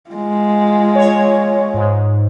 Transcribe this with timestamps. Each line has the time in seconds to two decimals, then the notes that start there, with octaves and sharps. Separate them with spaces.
0.10 G#3 F4
0.95 C#5
1.74 G#2